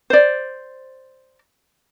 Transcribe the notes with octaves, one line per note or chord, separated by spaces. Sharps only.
C5 D5